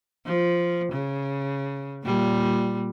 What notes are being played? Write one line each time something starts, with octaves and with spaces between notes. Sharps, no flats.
F3
C#3
A#2 G3